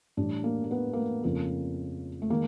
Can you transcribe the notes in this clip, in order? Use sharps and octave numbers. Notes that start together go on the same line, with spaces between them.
A2 E3 G3 D4
A#3
A#3
B3
A#3
A3
F2 C#3 F3 A#3
A3
D#3 G#3 A#3